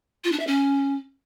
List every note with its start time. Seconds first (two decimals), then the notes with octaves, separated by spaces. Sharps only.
0.24 F4
0.32 D4
0.40 E5
0.47 C#4